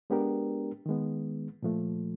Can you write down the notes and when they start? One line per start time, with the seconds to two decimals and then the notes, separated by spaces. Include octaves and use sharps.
0.10 G#3 B3 D4 G4 A#4
0.86 D#3 G#3 B3
1.63 A#2 F3 A3